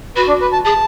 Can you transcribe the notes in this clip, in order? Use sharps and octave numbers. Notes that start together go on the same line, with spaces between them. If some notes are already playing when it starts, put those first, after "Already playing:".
F#4 B4
D4
B4
A5
G#4 A5